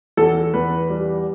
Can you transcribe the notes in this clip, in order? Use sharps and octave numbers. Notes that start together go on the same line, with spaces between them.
E2 A4
E2 B4
G3